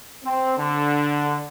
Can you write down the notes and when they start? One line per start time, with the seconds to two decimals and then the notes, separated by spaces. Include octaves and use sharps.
0.24 C4
0.58 D3